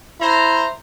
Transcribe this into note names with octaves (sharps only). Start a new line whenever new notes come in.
E4 C5 A#5